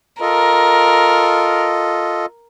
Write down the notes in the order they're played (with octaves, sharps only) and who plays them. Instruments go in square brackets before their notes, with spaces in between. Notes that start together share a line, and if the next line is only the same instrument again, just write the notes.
[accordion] F4 A4 D#5 [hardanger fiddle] A#4